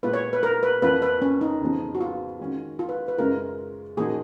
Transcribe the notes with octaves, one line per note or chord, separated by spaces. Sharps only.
A#2 G#3 B3 F4 B4
C#5
B4
A#4
B4
F2 F3 A#3 F4 B4
B4
C#4
D#4
F2 C#3 F3 B3
F#4
F4
D#3 G#3 C#4 F#4
F4
B4
B4
F#2 C#3 G#3 C#4 F4 A#4
A#2 F3 A#3 D#4 F#4 G#4